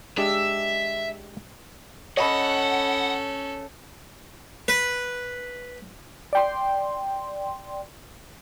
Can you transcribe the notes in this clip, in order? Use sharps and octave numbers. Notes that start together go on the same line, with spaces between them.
G#3 D4 G4 E5
C#4 A4 C#5 D#5 F#5 B5
B4
D5 G5 C6